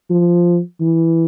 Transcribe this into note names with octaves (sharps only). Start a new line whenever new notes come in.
F3
E3